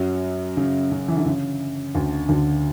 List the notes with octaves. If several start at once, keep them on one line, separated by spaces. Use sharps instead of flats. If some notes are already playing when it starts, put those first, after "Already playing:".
Already playing: F#2 F#3
C#3
C#3
E3
D3
C#3
D2 D3
D2 D3